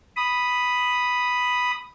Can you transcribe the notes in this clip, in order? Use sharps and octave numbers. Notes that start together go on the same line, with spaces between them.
B5 D#6